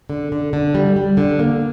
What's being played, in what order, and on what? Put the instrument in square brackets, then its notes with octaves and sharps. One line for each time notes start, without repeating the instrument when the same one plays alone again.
[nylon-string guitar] D3
D3
D3
G3
G3
D3
A#3